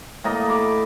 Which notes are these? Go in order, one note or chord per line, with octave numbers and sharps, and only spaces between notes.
A2 A#3 D#5
B5 D6